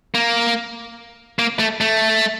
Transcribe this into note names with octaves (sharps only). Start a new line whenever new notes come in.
A#3
A#3
A3
A3